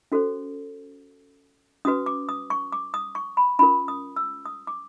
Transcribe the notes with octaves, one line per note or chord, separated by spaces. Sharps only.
C#4 F#4 A4 C5
C#4 F#4 B4 D#6
D6
D#6
C#6
D6
D#6
C#6
B5
C#4 F4 A#4 B5
D#6
E6
D#6
D6